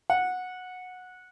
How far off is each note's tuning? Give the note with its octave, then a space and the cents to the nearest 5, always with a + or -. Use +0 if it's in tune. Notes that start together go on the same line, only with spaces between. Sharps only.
F#5 -15